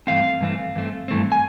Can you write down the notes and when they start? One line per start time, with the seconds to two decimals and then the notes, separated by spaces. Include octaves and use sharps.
0.07 G2 E3 A3 C4 F5
0.41 G2 E3 A3 C4
0.75 G2 E3 A3 C4
1.08 G2 E3 A3 C4
1.32 G#5